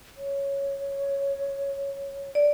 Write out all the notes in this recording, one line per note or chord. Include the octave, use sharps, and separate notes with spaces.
C#5
D5